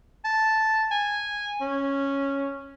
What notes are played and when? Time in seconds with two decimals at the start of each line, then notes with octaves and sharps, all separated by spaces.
0.24 A5
0.91 G#5
1.60 C#4